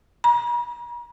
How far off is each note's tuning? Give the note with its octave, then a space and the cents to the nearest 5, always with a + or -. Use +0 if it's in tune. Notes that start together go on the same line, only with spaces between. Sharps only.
A#5 +45